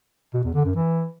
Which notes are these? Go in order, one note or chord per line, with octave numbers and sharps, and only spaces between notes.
B2
E2
D3
F#2
E3